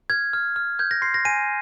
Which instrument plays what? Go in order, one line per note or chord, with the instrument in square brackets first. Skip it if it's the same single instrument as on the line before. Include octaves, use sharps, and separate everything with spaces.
[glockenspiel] F6 G#6
F6
F6
G6 G#6
A#6
C6 C7
A#6
G#5 D#7